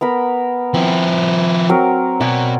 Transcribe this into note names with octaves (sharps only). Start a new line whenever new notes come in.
B3 A#4 B5
F3 C4 E4
F#3 C4 A#4
B2 D5 F#5 G#5